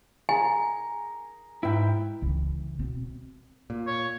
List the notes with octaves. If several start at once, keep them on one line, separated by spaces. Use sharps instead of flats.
G#4 A#4 G#5
G#2 E4 B4 G5
C#2 E3
B2 C4
A#2
C#5